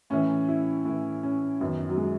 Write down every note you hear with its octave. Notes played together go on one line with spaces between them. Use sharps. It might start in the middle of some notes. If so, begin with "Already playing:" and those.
A2 E3 C#4
E4
A2 E3 E4
C#4
F#2 D#3 B3
F#3
G#3